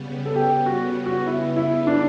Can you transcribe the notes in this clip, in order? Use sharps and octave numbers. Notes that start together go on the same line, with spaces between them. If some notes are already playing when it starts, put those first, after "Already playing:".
Already playing: C#3 G3 B3
A4
G4
F#4
F#4
E4
E4
D4